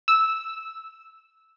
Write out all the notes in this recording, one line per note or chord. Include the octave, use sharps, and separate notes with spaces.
E6